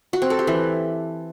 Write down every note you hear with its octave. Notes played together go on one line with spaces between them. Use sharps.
F#4
C4
A4
G4
E3